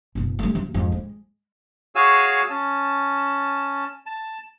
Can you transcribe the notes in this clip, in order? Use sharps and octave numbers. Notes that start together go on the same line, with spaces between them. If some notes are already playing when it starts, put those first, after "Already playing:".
F#1 B2
G3 A3
F#2 A#3
F2 G#2
G#3
F#4 G#4 C#5 F5 G#5 E6
C#4 A5
A5